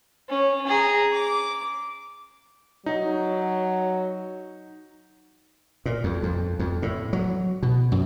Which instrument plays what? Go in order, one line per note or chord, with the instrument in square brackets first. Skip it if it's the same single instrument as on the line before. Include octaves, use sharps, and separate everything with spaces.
[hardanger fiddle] C#4
G#4 A#5
D6
[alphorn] F#3 [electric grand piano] D#4
[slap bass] A#2
F2
F2
F2
A2
F#3
B2
F#2